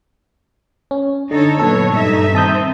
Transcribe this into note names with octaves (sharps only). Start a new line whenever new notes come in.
C#4
D3 D#4 A4 C#5
A#2 F#3 B3 A4 C#5
G2 D#4 E5
D#3 C4 A5 D#6 G6